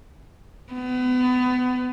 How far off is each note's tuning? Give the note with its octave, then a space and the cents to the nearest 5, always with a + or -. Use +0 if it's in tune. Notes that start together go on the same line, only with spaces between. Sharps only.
B3 +30